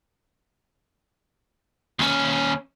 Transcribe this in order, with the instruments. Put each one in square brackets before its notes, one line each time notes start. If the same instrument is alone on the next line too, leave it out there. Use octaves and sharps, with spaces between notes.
[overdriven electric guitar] D#2 C#4